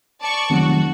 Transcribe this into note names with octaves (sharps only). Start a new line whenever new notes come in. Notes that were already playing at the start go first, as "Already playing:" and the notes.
D5 A5 C#6
F1 D#3 F#3 F#4